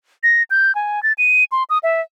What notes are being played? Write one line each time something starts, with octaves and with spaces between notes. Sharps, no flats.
A#6
G6
G#5
A6
D#7
C6
D#6
E5